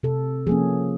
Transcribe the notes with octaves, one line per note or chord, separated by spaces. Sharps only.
C3 A4
F3 A#3 C#4 G#4